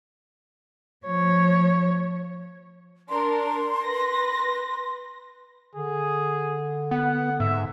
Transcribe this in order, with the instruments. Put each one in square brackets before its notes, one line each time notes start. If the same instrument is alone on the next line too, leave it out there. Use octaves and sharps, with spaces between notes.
[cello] F3 C#5
[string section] D4 A#4 [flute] C6
[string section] B4 A#6
[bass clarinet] D3 [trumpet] G#4
[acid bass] B3 [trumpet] F#5
[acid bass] G#2 [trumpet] E5